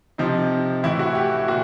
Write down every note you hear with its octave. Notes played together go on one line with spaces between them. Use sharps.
C3 F3 D#4
A2 E3 E4
F#4
G4
A#2 F#4